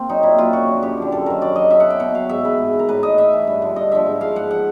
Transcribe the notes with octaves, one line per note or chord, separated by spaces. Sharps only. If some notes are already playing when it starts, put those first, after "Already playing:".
Already playing: A#3 C4
F#3 D#4
A#2 E4
F#3 F4
F#2 F#4
D3 F3
F#2 G4
D3 F3
F#2 A4
D#3 F#3 A#4
F#2 D5
D#3 F#3 D#5
B2 E5
F#5
F#3 G5
B2 F#5
F#3 F5
G#2 E5
E3 B4
G#2
E3
A#4
A2 B4
E3 D#5
A2 E5
E3
G2
D3 F3
G2 D#5
D3 F3 E5
G#2
F3 F5
G#2 F#5
F3 F#5